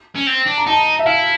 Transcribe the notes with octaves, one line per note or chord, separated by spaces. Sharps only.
C#4
C4
D4
A#5
D#4 A5
E5
E4 F5